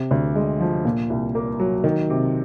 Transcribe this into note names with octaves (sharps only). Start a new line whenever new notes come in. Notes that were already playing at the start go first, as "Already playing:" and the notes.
Already playing: C3
D2
G#3
F3
A#2
C2
A#3
F#3
D#3
C3